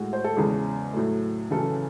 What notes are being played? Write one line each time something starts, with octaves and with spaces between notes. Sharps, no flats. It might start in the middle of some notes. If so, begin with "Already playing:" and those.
Already playing: A2 G#3 F#4
C5
A4
E2 C#3 G#3 G#4
A2 F#3 A3
F#2 C#3 E3 A4